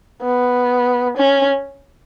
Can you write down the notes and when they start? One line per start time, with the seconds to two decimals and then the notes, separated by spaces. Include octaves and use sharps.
0.22 B3
1.17 C#4